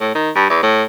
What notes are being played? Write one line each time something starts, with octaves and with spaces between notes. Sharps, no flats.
A2
D#3
G2
E2
A2